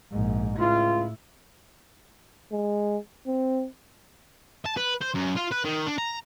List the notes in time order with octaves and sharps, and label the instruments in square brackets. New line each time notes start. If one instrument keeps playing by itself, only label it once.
[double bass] A#1 G#2
[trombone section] C#2 F4 [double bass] A2 E4
[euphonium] G#3
C4
[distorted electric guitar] A5
B4
C5
F#2
F4
B4
D#3
D4
A#5